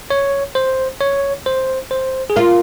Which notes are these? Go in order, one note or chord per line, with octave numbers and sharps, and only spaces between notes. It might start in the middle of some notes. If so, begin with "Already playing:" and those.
C#5
C5
C#5
C5
C5
G#4
F4 A#4